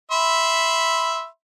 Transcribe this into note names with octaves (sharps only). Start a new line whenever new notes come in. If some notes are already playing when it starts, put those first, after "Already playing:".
E5 B5 C6